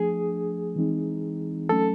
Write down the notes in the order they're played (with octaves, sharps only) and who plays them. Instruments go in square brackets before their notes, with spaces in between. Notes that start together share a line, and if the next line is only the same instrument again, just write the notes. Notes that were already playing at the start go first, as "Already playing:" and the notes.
Already playing: [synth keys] F3 A3 D4 [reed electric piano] G#4
[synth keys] E3 G#3 C4 D#4
[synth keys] F#3 A3 C#4 [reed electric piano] A4